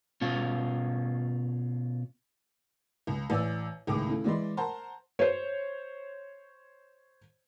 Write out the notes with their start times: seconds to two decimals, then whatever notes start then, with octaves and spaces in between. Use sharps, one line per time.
0.21 B2 C#4 F4
3.07 C#2
3.30 A1 D5 G#5 E6
3.87 C#2 A2 D#3 G#4 D6
4.09 C#3 A3 E4
4.24 E3 G#3 D5 D#5 C6
4.57 A#4 C5 F#5 A5 A#5 C6
5.19 C5 C#5